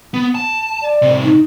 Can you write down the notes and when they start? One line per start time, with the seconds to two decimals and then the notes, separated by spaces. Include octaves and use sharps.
0.14 B3
0.35 A5
0.82 D5
1.02 A2 C3
1.23 D#4